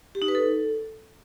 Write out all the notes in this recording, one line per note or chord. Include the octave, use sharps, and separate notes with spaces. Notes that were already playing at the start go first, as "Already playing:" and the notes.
G4
D#4
B4
A4